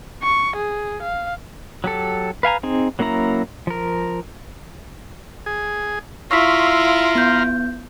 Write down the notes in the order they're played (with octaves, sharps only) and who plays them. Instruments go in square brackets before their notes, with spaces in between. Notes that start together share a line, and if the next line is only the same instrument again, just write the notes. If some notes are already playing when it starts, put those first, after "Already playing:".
[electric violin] C#6
G#4
F5
[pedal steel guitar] F#3 G4 A4
B4 F5 G#5 A#5
C4 D#4 G#4
F#3 A#3 C#4 E4 A#5
F3 A#4
[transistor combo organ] G#4
[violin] E4 F4 [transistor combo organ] F5 A#5 C6 [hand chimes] C#6 E6 B6
[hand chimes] E6
B3 G6